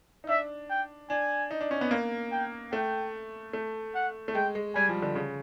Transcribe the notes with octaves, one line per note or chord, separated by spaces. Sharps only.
D#4
D4 E5
G5
D4 G#5
D#4
D4
C#4
B3
A#3
G5
A3 G5
A3
F#5
A3
G#3 G5
G#3
G3 G#5
F3
D3
C#3